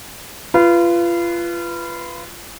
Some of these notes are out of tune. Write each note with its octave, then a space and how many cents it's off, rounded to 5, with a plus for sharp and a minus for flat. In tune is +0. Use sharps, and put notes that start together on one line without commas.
F4 -25 B4 +0